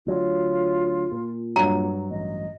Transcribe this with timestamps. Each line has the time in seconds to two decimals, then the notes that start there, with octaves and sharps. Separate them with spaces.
0.07 D2 F#3 F4
1.12 A#2
1.56 G2 F#3 A#5
2.11 A1 D#5